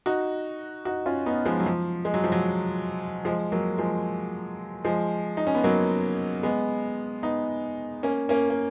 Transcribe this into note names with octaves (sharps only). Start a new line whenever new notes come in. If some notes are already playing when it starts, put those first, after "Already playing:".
D#4 F#4
D#4 F#4
C#4 F4
B3 D#4
F3 G#3
F#3
F3
G#3
F#3
F3
F#3
F3 G#3
F#3 A#3
F3 G#3
F3 G#3
D#4
C#4
B3
F#3 A#3
G#3 B3
B3 D#4
A#3 C#4
A#3 C#4
A#3